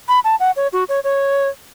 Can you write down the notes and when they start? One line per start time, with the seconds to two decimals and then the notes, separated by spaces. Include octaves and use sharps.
0.08 B5
0.24 A5
0.40 F#5
0.56 C#5
0.73 F#4
0.89 C#5
1.04 C#5